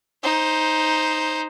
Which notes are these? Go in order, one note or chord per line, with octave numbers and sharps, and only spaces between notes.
D#4 C5